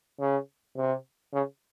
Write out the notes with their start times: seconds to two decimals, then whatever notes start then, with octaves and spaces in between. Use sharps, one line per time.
0.20 C#3
0.76 C3
1.33 C#3